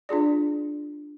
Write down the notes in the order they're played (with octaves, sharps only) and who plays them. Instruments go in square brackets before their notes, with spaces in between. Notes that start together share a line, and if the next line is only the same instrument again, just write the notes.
[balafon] D4 F4 G#4 D5